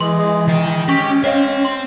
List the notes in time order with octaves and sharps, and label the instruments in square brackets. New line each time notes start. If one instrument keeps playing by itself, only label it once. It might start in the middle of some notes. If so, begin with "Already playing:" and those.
[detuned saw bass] E3 [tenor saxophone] G#3 [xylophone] C6
[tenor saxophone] G#3
[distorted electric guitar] D#3 G5 [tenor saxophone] G#3
[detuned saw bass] C#4 [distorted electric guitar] G4 [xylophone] C#6 A#6
[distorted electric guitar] C4 [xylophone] C#5 D#5 F5
[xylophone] C6